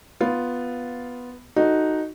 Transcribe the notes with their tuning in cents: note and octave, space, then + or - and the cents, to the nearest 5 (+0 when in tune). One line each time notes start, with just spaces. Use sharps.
B3 +0 F4 +0
D#4 +0 F#4 +0 A4 +0